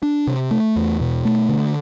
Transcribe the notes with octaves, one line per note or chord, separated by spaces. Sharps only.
D4
C3
A3
E2
B2
A3
D3